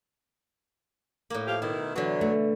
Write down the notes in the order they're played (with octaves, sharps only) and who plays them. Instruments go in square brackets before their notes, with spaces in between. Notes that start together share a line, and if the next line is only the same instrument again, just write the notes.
[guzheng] A2 A#3
[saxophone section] F3 G4 F5
[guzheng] B2 [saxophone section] D#3 E4
[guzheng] D3 E3 [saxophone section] F#3
[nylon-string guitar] A3